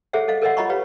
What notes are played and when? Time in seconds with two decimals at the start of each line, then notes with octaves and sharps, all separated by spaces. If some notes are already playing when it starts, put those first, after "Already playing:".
0.13 G#4 A4 C5 C#5 E5 F#5
0.28 A4 D#5 F5
0.42 A4 A#4 C#5 D#5 E5 F#5
0.57 F4 C#5 D#5 A#5 B5 C#6
0.69 G4 B4 C#5 F5